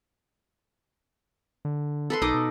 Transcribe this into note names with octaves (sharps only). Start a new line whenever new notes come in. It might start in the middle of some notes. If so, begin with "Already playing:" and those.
D3
A4 B4 C6
B1 D#4 D#5 D6
B2